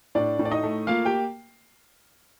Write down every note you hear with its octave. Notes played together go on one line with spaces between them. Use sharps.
A2 D4 D5
A2
D5
D#4 D#5
A3
A#3 F4 F5
G4 G5